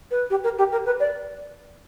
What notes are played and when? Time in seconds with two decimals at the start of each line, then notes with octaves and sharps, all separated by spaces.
0.11 B4
0.30 G4
0.44 A#4
0.58 G4
0.72 A#4
0.86 B4
1.00 D5